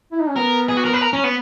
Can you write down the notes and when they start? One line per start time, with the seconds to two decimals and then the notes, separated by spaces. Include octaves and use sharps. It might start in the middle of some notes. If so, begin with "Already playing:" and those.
0.12 E4
0.20 D#4
0.29 C#4
0.36 B3 A#4
0.69 G#4
0.77 F#4
0.85 A#4
0.94 B4
1.02 A#4
1.13 C#4
1.24 B3